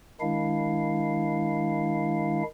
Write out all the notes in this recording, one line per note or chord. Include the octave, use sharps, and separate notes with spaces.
D#3 G#3 D4 E4 F5